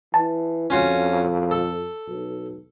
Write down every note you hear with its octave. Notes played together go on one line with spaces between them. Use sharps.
E3 A5
F2 C#4 F4 F#4
A4
B1